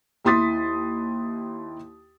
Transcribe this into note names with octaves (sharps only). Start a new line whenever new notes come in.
D#2 E4 C6 D#6 A6 B6